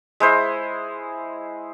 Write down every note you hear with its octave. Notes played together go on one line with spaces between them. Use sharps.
G#3 E4 C5 E5